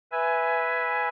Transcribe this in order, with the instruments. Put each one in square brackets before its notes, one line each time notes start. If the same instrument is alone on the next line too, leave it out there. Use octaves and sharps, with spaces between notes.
[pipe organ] B4 E5 G#5